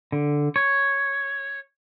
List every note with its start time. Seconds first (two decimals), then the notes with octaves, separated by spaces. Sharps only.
0.12 D3
0.56 C#5